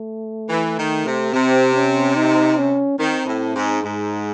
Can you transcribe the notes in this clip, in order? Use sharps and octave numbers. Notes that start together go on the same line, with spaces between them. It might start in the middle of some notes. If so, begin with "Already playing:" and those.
Already playing: A3
E3
D#3
C3
C3 C4
C#4
D#4
C#4
D#3 C4
A2
G#2
G#2 G#3